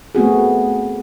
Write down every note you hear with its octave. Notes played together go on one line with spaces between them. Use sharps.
A3 B3 C4 F#4 G#4